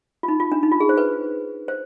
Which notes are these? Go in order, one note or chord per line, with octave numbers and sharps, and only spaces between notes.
F4
D#4
F4
D4
D#4
F4
G#4
C5
B4
C5